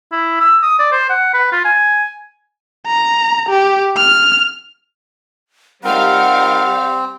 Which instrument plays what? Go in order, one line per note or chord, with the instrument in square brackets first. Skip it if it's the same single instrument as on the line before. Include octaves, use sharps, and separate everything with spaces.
[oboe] E4
E6
D#6
D5
C5
F#5
B4
F4
G#5
[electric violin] A#5
G4
F6
[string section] G3 F5 [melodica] C4 [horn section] D#4 F4 A#4 [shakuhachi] F#5